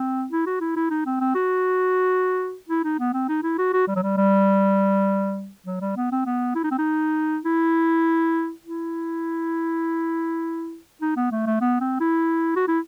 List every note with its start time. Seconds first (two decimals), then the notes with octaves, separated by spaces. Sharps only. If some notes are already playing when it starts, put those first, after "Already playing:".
Already playing: C4
0.31 E4
0.46 F#4
0.60 E4
0.76 E4
0.90 D#4
1.06 C4
1.20 C4
1.35 F#4
2.69 E4
2.84 D#4
2.99 B3
3.14 C4
3.29 D#4
3.43 E4
3.58 F#4
3.73 F#4
3.88 G3
3.96 F#3
4.03 G3
4.17 G3
5.66 F#3
5.81 G3
5.96 B3
6.12 C4
6.26 B3
6.55 E4
6.63 D#4
6.71 C4
6.78 D#4
7.45 E4
8.64 E4
11.01 D#4
11.16 B3
11.31 A3
11.47 A3
11.61 B3
11.80 C4
12.00 E4
12.56 F#4
12.68 E4